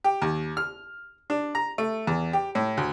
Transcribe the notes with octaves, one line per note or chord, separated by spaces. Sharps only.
G4
D#2
F6
D4
A#5
A3
E2
G4
A2
D2